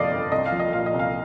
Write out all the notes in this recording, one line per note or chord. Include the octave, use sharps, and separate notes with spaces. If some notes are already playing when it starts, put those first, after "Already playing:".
Already playing: G1 F2 C3 D5 D#5 F5
G1
C2 D#5
F5
F3
D#5
A#2 F5
D#5
C2
F5